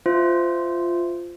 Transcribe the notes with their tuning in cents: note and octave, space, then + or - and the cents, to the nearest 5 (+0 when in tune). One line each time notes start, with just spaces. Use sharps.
F4 -5 C5 -20 E5 +0